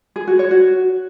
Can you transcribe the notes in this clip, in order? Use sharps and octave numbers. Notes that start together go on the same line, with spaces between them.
G#4
F#4
C#5
F#4